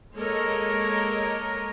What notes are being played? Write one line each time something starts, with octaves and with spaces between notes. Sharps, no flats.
G#3 A#3 A4 A#4 C#5 D#5